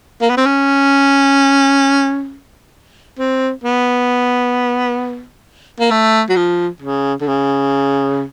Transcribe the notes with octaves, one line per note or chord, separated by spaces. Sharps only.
A#3
B3
C4
C#4
C4
B3
A#3
A3
F#3
F3
C#3
D3
C#3